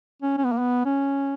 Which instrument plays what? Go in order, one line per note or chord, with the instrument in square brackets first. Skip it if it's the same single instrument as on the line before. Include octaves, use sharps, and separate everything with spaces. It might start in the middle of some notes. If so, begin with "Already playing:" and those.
[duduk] C#4
C#4
B3
A#3
B3
C#4